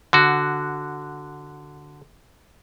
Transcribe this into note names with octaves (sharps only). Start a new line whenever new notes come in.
D3 F#4